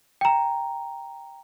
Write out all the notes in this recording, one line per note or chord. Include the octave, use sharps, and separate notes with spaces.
G5 A#5